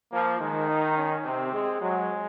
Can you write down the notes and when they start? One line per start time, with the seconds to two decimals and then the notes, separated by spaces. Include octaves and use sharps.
0.12 F3 A#3
0.40 D#3 G#3
0.69 D#4
0.97 C#4
1.25 C3 C4
1.53 G#3
1.81 F#3 G#3